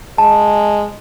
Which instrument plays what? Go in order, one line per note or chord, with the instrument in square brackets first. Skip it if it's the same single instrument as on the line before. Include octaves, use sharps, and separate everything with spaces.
[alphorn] G#3 [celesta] A5